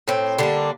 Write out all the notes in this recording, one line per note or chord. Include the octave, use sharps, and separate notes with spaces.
A2 C4
D3 G3 A#3 D4